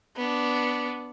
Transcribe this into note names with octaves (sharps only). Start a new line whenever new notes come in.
B3 D4